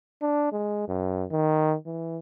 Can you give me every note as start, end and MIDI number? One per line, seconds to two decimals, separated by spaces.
0.22 0.49 62
0.53 0.85 56
0.88 1.25 42
1.32 1.76 51
1.86 2.19 52